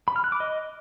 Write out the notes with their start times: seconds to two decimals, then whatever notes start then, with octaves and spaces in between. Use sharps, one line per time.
0.08 B5
0.16 F6
0.24 F#6
0.32 D6
0.40 D#5